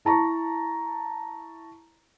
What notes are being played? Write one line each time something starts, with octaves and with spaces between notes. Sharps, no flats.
E4 A5 A#5 C#6